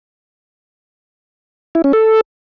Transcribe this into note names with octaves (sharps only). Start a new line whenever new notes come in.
E4
C#4
A4